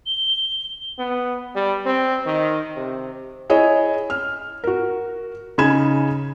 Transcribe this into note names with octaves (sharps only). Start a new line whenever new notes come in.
G7
B3
G3
C4
D#3
C3
E4 G#4 C#5 D#5
F6
F#4 A#4
C#3 D#4 G#4 B5 G#6 E7